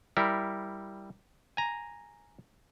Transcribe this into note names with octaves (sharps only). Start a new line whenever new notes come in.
G3 E4 A#4
G#5 A#5